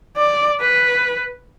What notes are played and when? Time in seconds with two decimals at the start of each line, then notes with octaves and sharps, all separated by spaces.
0.17 D5
0.60 B4